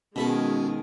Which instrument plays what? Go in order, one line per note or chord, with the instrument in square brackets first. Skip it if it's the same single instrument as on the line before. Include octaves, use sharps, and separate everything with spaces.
[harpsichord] B2 E4 A4 [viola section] D#3 G#3 G#4 [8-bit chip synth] C#4 F#4